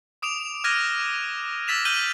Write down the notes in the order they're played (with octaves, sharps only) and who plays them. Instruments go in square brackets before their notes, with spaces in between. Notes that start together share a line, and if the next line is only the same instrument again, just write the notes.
[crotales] D6 D#6 D7 E7 F7
D6 F6 F#6 G#6 A#6 D#7
E6 A6 B6 E7 F7
F6 G6 A#6 D#7 F#7 G7